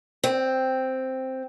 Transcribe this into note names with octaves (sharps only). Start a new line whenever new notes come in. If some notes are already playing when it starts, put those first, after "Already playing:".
C4